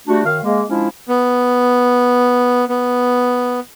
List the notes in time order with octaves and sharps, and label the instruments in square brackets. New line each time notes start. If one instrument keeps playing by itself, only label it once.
[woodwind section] G3 A3 D4 F#4
F#2 D#3 F5
G#3 A#3
F3 G#3 C#4 D4 E4
[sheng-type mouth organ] B3
B3